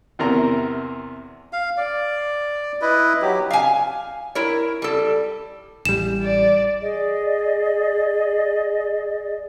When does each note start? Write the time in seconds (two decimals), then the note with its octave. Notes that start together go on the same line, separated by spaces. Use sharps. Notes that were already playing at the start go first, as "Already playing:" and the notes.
0.19 E2 C3 A#4 A#5
1.53 F5
1.77 D5
2.81 E4 B4 D#5
3.22 F#3 G4
3.50 F5 G#5
4.35 E4 A#4 C#5
4.82 G3 A4
5.85 A1 G3 E7
6.22 D5
6.80 G#4 D5 D#5